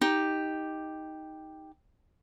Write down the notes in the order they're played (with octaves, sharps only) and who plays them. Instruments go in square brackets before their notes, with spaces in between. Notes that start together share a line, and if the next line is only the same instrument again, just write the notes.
[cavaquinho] D#4 G4